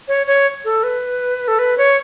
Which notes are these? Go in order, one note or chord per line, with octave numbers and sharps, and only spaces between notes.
C#5
C#5
A4
B4
A4
B4
C#5